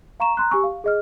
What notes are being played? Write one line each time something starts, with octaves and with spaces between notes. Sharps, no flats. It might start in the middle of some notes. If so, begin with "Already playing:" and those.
F5 A#5 C#6 E7
A#5 C6 F#6
G4 G#5 C#6 E6
F5
G#4 D#5 F6